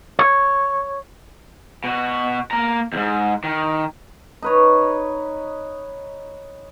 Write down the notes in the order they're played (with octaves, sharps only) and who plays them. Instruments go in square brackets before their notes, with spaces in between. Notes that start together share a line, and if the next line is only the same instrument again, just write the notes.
[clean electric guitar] C#5
[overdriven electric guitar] B2 F#4
A#3 A#5
E2 G#2
D#3
[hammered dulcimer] D#4 B4 C#5